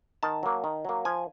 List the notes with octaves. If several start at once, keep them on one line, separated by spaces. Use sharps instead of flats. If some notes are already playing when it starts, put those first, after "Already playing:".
D#3 A5
F#3 A#3
D#3
F#3 A#3
F3 G#5